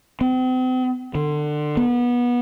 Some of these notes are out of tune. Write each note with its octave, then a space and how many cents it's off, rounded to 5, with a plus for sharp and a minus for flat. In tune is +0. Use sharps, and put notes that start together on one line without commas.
C4 -40
D3 +25
B3 -25